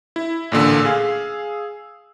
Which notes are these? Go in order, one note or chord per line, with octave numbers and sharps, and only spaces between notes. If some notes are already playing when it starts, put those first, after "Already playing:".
E4
A1 A#2 D3 E6
G#4 F5